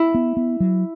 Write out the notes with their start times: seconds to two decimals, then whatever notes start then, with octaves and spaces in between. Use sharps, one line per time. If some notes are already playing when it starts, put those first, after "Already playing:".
Already playing: E4
0.15 B3
0.37 B3
0.60 F#3